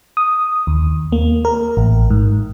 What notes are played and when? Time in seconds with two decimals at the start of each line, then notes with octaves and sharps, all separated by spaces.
0.17 D#6
0.67 D#2
1.12 A#3
1.45 A#4
1.77 A1
2.10 G#2